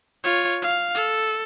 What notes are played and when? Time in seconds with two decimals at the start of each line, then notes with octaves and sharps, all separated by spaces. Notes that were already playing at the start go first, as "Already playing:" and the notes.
0.23 F4 C#5
0.62 F5
0.95 A4